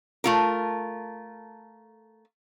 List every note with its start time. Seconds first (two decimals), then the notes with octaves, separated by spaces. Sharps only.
0.24 A3 F4 A#4